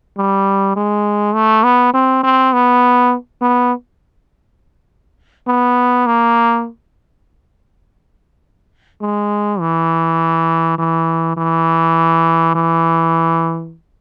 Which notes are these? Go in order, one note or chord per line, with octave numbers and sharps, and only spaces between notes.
G3
G#3
A3
B3
C4
C4
B3
B3
B3
A#3
G#3
E3
E3
E3
E3